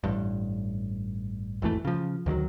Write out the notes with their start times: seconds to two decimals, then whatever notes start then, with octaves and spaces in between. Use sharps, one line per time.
0.04 A1 G2
1.62 G#1 E2 E3 A3
1.85 C#3 F3
2.26 D2 D#3 F3 F#3